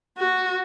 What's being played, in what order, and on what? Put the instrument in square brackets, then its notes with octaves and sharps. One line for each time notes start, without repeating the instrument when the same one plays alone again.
[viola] F#4